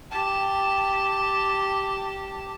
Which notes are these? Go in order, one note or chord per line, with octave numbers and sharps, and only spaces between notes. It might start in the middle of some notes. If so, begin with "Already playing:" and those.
G4 A5